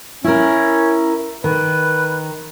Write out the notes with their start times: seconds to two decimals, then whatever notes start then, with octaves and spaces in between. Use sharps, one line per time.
0.24 C#4 E4 A#4
1.44 D#3 B4